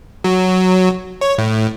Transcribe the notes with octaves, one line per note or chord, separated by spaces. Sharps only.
F#3
C#5
A2